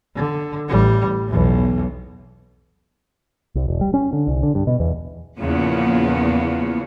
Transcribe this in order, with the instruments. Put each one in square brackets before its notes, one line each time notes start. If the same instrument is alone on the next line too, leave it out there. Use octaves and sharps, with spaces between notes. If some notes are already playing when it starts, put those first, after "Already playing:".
[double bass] D3
A1 G3
B1 E2
[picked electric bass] C2
E1
G3
C#4
D3
C2
D3
G2
B2
E2
[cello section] E2 A#2 C#3 F3 A#3 B3